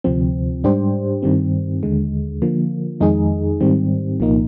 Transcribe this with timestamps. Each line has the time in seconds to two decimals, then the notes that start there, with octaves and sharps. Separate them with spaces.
0.04 D2 C3 F3 C4
0.64 G#2 G3 D4 G4 C5
1.22 G2 D#3 G3 C4
1.83 D#2 D3 G#3
2.42 D3 F3 A#3
3.00 F2 D#3 G#3 D#4 G#4
3.60 G#2 D#3 G3 C4
4.20 C2 A#2 F3 A#3 D#4